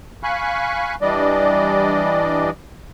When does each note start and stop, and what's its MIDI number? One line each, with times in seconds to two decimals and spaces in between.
0.23 0.95 77
0.23 0.95 80
0.23 0.95 83
0.23 0.95 85
0.23 0.95 90
1.02 2.50 52
1.02 2.50 55
1.02 2.50 62
1.02 2.50 74
1.02 2.50 75